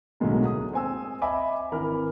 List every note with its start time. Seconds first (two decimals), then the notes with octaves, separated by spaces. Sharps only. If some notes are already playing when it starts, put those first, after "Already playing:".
0.20 B1 A2 D3 F#3 G#3 A#3
0.45 D#6
0.73 C4 G#5 E6
1.22 D#5 E5 G#5 B5 D6
1.72 G#1 E3 A#4 B5 F6